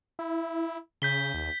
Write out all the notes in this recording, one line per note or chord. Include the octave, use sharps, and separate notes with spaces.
E4
C#3 G6 B6 G7
D#2